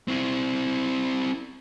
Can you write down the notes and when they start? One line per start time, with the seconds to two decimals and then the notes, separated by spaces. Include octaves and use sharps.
0.08 C4 E4